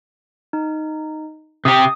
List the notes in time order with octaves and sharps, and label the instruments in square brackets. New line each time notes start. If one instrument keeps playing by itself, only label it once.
[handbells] D#4
[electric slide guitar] C3 G4 [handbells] D#6